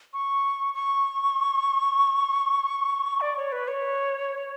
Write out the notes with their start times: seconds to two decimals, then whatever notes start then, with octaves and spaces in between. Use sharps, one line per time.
0.13 C#6
0.75 C#6
3.21 D5
3.37 C#5
3.52 B4
3.68 C#5